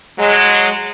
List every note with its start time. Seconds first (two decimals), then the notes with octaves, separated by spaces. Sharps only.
0.18 F#3 G#3